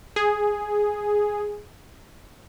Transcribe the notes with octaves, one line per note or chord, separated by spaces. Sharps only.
G#4